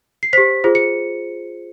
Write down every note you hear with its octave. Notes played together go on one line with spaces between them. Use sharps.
C7
G4 C5 B6
F4 G#4 C5
C#7